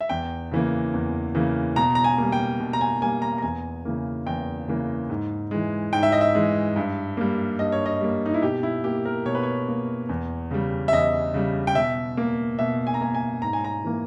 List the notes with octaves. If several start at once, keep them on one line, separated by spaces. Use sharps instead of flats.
E5
E2 G5
C#3 E3 A#3
E2
C#3 E3 A#3
B2 A#5
A#5
G#5
G3 A#3
G5
B2
A#5
G#5
G3 A#3 G#5
A#5
A#5
E2 G#5
C#3 E3 A#3
E2 G5
C#3 E3 A#3
G#2
E3 G#3
G#2 G5
E5
D#5
E5
E3 G#3
G2
G3 A#3
G2 D#5
C#5
D#5
G3 A#3
D#4
E4
B2 G4
E4
A#3 G4
A#4
B2 C#5
B4
C#5
A#3
E2
C#3 G3
E5
E2 D#5
C#3 G3
G5
B2 E5
A#3
B2 E5
G#5
A#5
A#3 G#5
G#5
G#2 A#5
G#5
A#5
E3 A#3